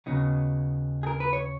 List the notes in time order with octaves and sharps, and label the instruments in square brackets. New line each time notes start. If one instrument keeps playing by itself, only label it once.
[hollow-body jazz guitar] D#2 C#3 F#3 B3 D#4
G#4
A#4
B4
C#5